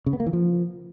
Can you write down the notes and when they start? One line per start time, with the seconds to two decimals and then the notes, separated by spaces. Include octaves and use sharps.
0.06 C#3
0.13 B3
0.20 A#3
0.27 E3
0.33 F3